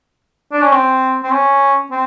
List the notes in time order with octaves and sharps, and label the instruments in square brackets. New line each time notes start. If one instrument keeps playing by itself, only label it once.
[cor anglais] D4
C#4
C4
C4
C#4
C4